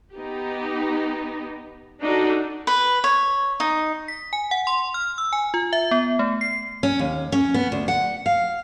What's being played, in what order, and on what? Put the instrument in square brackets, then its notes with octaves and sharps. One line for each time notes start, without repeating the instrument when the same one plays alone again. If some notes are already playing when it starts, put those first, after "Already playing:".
[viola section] B3 D#4 G4
D4 D#4 F#4 A4
[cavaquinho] B4
C#5
D#4
[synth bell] B6
G#5
F#5
C6
F6
E6
G#5
F4
E5
B3
A3
C7
[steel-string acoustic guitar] C#4
D#2
C#4
B3
D2
F#5
F5